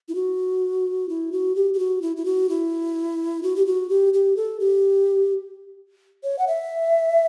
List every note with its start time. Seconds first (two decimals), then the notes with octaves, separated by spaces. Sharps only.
0.09 E4
0.15 F#4
1.09 E4
1.32 F#4
1.55 G4
1.74 G4
1.79 F#4
2.02 E4
2.17 E4
2.25 F#4
2.49 E4
3.43 F#4
3.56 G4
3.66 F#4
3.89 G4
4.14 G4
4.36 A4
4.60 G4
6.24 C#5
6.39 F#5
6.47 E5